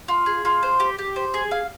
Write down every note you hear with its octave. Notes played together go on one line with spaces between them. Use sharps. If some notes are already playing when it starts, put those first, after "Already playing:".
F4
G#4
F4
C5
G4
G4
C5
G#4
F5